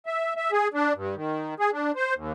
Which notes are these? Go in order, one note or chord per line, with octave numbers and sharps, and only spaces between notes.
E5
E5
G#4
D4
G2
D#3
G#4
D4
C5
D#2